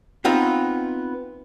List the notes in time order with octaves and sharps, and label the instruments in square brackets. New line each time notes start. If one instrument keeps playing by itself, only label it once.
[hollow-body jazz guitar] B3 C4 D#4 F4